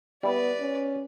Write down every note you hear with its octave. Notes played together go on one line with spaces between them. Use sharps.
G3 B3 E4 B4 D5
C#4